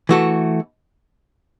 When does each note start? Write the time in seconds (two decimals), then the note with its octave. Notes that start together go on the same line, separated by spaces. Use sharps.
0.09 E3 A3 F#4 A4